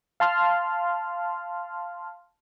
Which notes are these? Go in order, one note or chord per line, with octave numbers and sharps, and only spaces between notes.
F5 A5 C6 F6